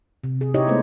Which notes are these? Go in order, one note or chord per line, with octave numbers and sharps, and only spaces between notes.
C3
G#4
D#4 E4 G4 C#5 D#5
G#3 A3 B3 E4 C5